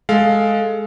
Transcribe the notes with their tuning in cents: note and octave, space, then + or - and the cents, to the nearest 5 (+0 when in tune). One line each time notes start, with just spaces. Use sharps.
G#3 +10 A4 +0 F5 +0